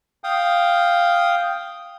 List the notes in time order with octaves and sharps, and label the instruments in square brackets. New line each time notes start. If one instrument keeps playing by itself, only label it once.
[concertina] F5 G5 D#6